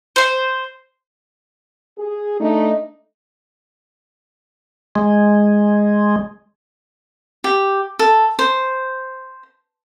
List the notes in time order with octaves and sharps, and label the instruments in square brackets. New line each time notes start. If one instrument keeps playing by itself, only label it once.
[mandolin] C5 C6
[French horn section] G#4
A3 D4 D#4
[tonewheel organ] G#3
[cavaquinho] G4
A4
C5